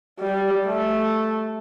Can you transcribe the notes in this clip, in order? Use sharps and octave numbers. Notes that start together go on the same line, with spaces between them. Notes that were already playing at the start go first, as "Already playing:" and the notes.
G3
A3